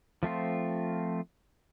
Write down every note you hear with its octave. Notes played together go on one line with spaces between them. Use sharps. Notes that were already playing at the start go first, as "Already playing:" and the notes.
F3 A3 C4 F4